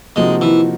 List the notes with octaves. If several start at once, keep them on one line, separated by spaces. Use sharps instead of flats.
C3 F3 G#3 A#3 D#4 F#4
E3